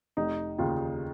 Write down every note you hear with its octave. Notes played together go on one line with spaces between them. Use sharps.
F1 D#4
D#2 C#3 F4